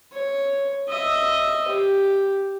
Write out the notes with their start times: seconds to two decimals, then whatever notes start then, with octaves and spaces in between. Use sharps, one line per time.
0.12 C#5
0.89 D#5 E5
1.68 G4